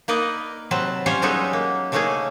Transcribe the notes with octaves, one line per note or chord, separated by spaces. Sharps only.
A#3 D#4 A#4 B4 D5 D#5
C3 F#3 C4 B4 A5
G3 C#4 F4 C5 C#5
F#3 G#3 B3 D#4 G4 A4
A#3
C#3 A3 A#3 C#4 D#4 G#4